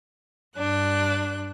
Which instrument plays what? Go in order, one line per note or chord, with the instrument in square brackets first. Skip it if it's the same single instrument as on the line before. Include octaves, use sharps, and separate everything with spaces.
[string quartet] G2 D4 F#6